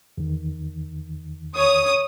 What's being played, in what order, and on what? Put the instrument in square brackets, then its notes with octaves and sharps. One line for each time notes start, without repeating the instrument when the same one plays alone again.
[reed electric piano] E2 D#3
[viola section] C#5 [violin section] D#6